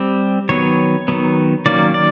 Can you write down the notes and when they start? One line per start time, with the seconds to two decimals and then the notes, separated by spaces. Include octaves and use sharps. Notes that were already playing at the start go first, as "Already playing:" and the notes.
Already playing: G3 C4
0.49 D#3 F#3 B3 C#5
1.08 D#3 F#3 B3
1.66 D#3 F#3 A#3 C#4 D5
1.94 D5